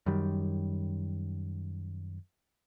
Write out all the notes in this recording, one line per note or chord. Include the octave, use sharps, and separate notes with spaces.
F#2 D#3 G3